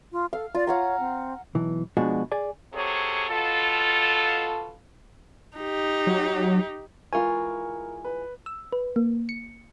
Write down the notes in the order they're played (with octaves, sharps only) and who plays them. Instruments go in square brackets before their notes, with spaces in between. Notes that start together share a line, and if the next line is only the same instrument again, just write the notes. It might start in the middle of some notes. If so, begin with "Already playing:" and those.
[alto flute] F4
[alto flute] A4 [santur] F5
[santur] F4 [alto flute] D5
[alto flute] C#5 [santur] F5 F#5 A#5
[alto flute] C4
[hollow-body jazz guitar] B1 E3
B2 F3 G#3 D4 F#4
G#4 D5 G#5
[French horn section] C3 F#3 G#4 A4 C#5
B2 F4 A4
[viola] D#4 G4
[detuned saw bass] F#3
[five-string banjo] E3 G#3 F4 [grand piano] A#4 C#6 [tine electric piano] G#5
[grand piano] B4
[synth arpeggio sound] E6
B4
A#3
C#7